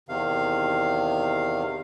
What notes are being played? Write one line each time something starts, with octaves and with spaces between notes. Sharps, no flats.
E2 C3 D#3 F5